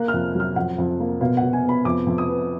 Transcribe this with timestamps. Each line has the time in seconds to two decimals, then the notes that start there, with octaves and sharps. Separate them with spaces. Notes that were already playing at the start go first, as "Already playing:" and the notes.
Already playing: A#3 F#6
0.08 F6
0.14 F2
0.35 F#3 F6
0.56 F2 F#5
0.78 F2
1.00 A#3
1.21 B2 F5
1.37 F#5
1.42 B2
1.53 G#5
1.64 B3 B5
1.85 F2 D6
2.07 F2
2.18 D#6
2.29 B3